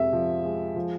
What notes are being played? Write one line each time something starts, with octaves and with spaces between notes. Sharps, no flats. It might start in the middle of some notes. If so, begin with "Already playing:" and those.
Already playing: F2 C3 G#3 E5
F3
G#3
F3